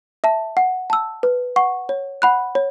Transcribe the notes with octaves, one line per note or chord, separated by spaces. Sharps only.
E5 A5
F#5
A5 E6
B4
F#5 C#6
C#5
F#5 B5 F#6
C#5